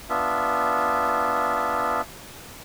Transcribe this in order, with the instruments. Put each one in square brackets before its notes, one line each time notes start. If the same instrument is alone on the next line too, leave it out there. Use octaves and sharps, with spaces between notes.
[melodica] B3 D4 F4 E5